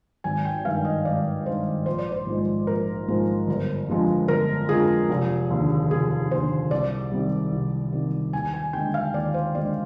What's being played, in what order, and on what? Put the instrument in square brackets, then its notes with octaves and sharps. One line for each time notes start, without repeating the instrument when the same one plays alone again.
[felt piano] G#1 G#5
G5
G2 D#3 F5
D#5
G#1 D5
G2 D#3 C5
A#1 C5
D5
C5
G#2 F3 G#3
A#1 A#4
G#2 F3 G#3
G1
F2 D3 F3 G#3
G1 A#4
F2 D3 F3 G#3 G#4
F1
D#2 D3
F1 G#4
D#2 D3 C5
C2 D5
C3 D#3 G3
C2
C3 D#3 G3
D#2 G#5
G#5
D3 G#3 G5
F5
D#2 D5
C5
D3 G#3 D5